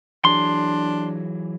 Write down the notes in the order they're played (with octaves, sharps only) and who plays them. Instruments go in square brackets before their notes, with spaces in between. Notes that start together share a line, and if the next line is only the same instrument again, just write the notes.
[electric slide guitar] E3 F#3 G#4 [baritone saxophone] D4 [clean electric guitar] C6